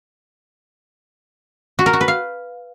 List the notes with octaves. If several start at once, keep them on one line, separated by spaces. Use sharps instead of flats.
F#4
A#4
F#4
B4
F5